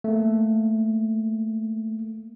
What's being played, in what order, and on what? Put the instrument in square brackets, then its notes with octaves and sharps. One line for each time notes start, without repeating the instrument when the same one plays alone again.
[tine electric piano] A3 A#3